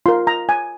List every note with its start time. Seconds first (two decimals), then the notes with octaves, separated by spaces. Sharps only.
0.06 F4 A#4 C6
0.27 A#5
0.49 G#5